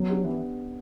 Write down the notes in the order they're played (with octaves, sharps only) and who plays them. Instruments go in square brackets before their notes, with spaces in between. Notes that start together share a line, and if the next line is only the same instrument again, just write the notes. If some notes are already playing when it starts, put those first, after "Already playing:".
Already playing: [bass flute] F#3 [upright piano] B3
[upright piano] D4 G4
[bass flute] E3 [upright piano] B3